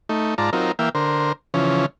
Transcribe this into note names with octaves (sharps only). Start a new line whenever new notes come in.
A3 D#4
G#2 F4 D5 A5 A#5
F#3 C4 D#4 F4 A#4
E3 A#3 E5 F5 G5
D3 A#4 C5
C#3 E3 F3 C#4